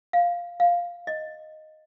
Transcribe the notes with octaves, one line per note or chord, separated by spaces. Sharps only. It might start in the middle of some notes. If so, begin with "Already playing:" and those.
F5
F5
D#5